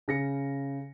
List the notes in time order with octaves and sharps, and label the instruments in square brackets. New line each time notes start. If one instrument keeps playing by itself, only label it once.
[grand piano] C#3 A#6 C#7